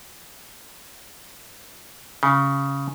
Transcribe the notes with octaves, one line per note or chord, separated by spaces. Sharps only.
C#3